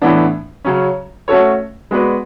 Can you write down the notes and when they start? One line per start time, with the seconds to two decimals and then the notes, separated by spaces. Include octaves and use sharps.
0.02 A2 E3 B3 D4
0.65 C#3 F#3 C#4
1.28 A3 C#4 F#4 A4 C#5
1.91 G#3 B3 F#4 B4 D5